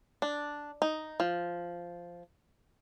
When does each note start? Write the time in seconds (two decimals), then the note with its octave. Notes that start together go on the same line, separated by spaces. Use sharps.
0.22 D4
0.82 D#4
1.20 F3